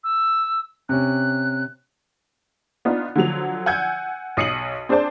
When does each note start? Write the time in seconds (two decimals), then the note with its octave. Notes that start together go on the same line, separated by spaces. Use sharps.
0.04 E6
0.89 C3 C#4 F#6
2.85 B3 D4 D#4 F4
3.16 D3 F3 F#3 F7
3.66 F#5 G#5 E6 G6 G#6
4.37 B1 D#6 C7 C#7 D#7 F#7
4.89 C4 D4 G#4 C5 D5 A5